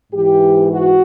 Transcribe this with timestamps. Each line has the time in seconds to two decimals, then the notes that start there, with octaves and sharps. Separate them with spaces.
0.12 G#2 E3 G4
0.71 F#4